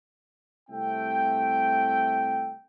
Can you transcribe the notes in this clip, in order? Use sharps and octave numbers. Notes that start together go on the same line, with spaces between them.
C2 A3 C4 E5 G5